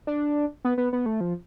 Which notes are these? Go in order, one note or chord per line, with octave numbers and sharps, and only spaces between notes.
D4
B3
B3
B3
A3
F3